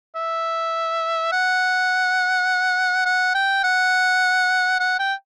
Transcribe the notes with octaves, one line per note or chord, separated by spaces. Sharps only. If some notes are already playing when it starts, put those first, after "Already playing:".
E5
F#5
F#5
G5
F#5
F#5
G5